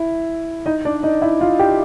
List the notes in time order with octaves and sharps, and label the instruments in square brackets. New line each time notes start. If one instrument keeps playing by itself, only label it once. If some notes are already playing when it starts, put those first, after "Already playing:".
Already playing: [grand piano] E4
D#4 D#5
D4 D5
D#4 D#5
E4 E5
F4 F5
G4 G5